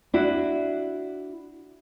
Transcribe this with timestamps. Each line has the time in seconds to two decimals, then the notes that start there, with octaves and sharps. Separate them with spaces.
0.13 D4 E4 F#4